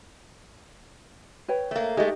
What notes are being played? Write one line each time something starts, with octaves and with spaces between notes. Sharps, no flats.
B4 C#5 G5
A3 A#3
G#3 A3 D#4 G4 D#5